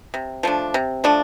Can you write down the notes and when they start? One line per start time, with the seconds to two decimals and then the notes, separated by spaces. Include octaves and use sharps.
0.14 C3
0.43 F3 A3 D4
0.74 C3
1.04 F3 A3 D4